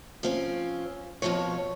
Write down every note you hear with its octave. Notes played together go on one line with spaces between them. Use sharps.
F3 C4 C#4
F2 G#2 B2 F3 C#5